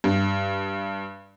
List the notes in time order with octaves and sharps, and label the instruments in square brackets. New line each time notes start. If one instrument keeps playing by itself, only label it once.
[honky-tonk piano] G2